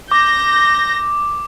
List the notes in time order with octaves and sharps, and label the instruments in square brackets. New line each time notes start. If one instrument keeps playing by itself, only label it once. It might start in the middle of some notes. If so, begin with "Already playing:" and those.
[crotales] D6 [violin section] G6 A#6